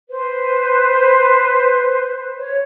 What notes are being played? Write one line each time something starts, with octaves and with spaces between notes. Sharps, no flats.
B4 C5
C#5